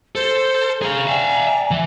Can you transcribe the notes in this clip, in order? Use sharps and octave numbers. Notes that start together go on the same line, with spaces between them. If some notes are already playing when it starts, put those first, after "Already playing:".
A4 C5
G#4 F5 A#5
D5 E5 F5 G5 G#5
E3 E5